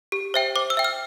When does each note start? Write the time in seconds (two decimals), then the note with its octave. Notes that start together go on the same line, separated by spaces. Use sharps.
0.12 G4
0.34 C5 E5 G5
0.56 C5 D6
0.70 E6
0.77 E5 G5
0.84 F6